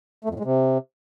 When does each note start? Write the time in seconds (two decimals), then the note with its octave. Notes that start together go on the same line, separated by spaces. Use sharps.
0.24 A3
0.30 F2
0.35 A2
0.40 G#3
0.45 C3